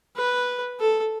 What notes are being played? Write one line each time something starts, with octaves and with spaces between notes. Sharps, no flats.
B4
A4